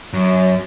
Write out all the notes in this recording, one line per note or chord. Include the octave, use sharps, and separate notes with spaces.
F#2